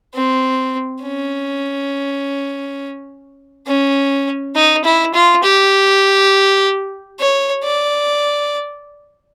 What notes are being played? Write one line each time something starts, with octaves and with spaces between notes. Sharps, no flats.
C4
C#4
C#4
D#4
E4
F4
G4
C#5
D5